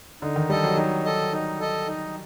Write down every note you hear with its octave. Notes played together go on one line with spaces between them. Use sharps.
D3 D#4
D#3
G3 A4 D#5
F#3
F#3 D#4
A4 D#5
D#4
A4 D#5
D#4